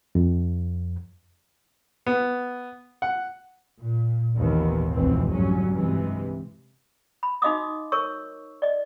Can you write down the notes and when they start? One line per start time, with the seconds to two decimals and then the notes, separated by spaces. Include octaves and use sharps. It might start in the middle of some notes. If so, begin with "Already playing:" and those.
0.15 F2
2.06 B3
3.02 F#5
3.81 A#2
4.36 G#1 D#2 A#2 D#3 E3 B3
4.93 F1 C#2 B2 E3 C4
5.30 C2 G#2 D3 F#3 C#4
5.75 G2 C3 E3 G#3
7.23 B5
7.42 D#4 F#4 D#5 F5 D6 D#6
7.92 A#4 C#5 C#6 E6
8.62 D5 D#5